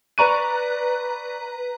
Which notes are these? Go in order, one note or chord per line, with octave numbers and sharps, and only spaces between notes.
B4 D5 A#5 C#6 F#6 D#7